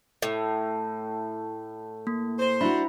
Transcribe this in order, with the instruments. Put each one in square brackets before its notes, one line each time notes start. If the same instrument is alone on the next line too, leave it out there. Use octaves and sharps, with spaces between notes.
[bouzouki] A2 [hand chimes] E5
[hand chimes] A#3
[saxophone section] C5
[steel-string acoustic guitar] D4 F#4 [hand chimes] E4 E5 B5